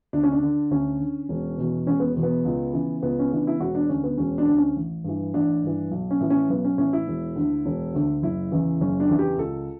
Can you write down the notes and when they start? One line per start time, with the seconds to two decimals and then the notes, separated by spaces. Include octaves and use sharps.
0.13 D2 D4
0.23 C#4
0.32 D4
0.43 D3
0.71 D2 C#4
1.00 D3
1.29 E1
1.58 E2 B2
1.87 E1 C#4
2.00 B3
2.16 E2 B2
2.23 B3
2.45 C#2
2.73 C#3 E3
3.03 C#2 B3
3.19 C#4
3.32 C#3 E3 D4
3.47 E4
3.60 E1 F#4
3.75 D4
3.89 D2 D3 C#4
4.04 B3
4.18 E1 C#4
4.38 D4
4.47 D2 D3
4.57 C#4
4.77 A1
5.04 G2 E3
5.34 A1 D4
5.63 G2 E3
5.91 B1
6.11 C#4
6.21 A2 E3
6.30 C#4
6.49 B1 B3
6.64 C#4
6.78 A2 E3 C#4
6.93 E4
7.08 E1
7.36 D2 D3
7.66 E1
7.94 D2 D3
8.22 F#1 E4
8.52 E2 C#3 E3
8.81 F#1 C#4
9.00 D4
9.09 E2 C#3 E3
9.19 G4
9.38 C#2 A4